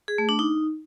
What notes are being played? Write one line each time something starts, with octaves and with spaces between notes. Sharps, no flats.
G#4
A3
D4
D#4